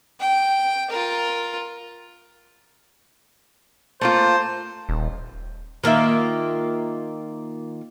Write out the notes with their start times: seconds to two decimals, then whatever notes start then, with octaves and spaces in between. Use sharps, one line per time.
0.20 G5
0.90 F4 A#4
4.01 A3 A#3 F4 C5
4.89 D#1
5.84 D#3 A#3 F4 E5